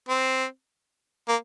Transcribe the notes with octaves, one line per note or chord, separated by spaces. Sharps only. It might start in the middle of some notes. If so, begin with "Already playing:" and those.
C4
A#3